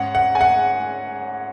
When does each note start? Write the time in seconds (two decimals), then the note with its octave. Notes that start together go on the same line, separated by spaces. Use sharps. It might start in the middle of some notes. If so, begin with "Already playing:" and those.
Already playing: G#2 C#4 F#5
0.15 F#5
0.35 G#5
0.41 F#5